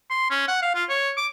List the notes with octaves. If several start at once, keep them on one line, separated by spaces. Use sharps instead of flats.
C6
C#4
F#5
F5
F4
C#5
D6